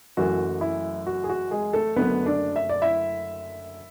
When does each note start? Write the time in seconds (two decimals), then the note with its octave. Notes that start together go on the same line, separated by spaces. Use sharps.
0.17 F#1 F#2 E3 A3 F#4
0.61 E4
1.07 F#4
1.24 G#4
1.29 F#4
1.51 G#3 G#4
1.73 A3 A4
1.96 F#1 F#2 D3 A3 B3 B4
2.26 D4 D5
2.56 E5
2.69 D5
2.82 E4 E5